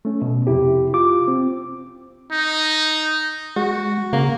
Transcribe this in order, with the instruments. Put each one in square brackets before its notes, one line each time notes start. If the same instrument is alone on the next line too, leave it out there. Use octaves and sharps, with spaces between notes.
[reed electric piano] A3 C#4
B2
F2 C3 E4 G4
F4 D6
C4
[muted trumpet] D#4
[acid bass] G#3 [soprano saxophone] F#4
[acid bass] C#3 [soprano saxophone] A#3